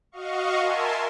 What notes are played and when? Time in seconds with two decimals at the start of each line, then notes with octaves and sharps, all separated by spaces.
0.12 F#4 D#5 F5 C#6
0.60 A#4 E5 G#5 A5 C6